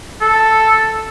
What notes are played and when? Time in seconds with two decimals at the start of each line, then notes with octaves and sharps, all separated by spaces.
0.21 A4